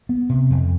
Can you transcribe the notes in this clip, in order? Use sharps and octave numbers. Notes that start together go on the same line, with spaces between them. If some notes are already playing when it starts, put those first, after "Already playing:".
B3
C3
F2